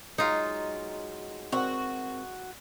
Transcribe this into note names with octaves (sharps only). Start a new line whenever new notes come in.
F#3 G#3 D#4 F4
C4 F#4 A#4 F#5